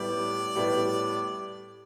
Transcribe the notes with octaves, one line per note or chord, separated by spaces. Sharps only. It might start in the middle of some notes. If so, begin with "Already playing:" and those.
Already playing: A2 G3 B3 D5
A2 G3 B3